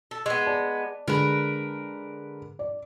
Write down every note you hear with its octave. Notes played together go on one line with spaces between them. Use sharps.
A4
G#3 B3
D5 A5
D3 G#3 A#4 B4
D5